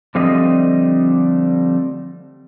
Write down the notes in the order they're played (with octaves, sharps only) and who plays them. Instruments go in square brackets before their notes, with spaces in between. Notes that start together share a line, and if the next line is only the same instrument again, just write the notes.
[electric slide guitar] D3 F3 G3 A3 C4 D#5